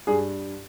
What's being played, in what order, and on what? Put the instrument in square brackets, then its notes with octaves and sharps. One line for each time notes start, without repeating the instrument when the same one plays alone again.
[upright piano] G2 G#4